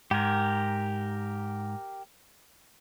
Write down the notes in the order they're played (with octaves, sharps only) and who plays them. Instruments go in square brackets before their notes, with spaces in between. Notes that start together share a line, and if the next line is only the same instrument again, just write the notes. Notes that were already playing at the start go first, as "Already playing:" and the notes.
[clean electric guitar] G#2 [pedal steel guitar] G4 A#4